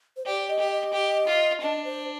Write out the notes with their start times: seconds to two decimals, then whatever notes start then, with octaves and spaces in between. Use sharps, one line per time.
0.17 C5
0.26 G4 D5
0.48 D#5
0.60 G4
0.71 D#5
0.93 G4
1.27 F4
1.61 D4 D#5
1.85 C5